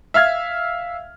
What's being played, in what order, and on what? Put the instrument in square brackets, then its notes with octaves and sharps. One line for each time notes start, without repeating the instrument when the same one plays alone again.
[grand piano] E5 F5 F6 G#6